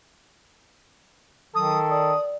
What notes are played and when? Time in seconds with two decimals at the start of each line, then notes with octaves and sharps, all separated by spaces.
1.55 D#3 F#3 A4 D#6
1.90 D5 D#6